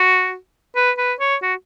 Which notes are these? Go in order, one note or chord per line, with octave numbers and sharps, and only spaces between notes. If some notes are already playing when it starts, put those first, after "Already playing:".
Already playing: F#4
B4
B4
C#5
F#4